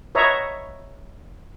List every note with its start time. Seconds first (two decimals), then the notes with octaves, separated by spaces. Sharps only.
0.15 B4 C#5 D#5 E5 A#5